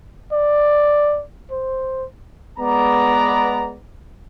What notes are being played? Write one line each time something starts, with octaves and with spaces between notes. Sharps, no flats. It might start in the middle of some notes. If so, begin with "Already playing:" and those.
D5
C5
G#3 B3 D5 A#5